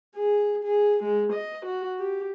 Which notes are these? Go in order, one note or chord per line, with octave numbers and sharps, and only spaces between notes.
G#4
G#4
G#3
D#5
F#4
G4